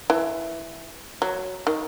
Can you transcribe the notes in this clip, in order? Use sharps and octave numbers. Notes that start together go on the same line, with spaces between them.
E3
F#3
D#3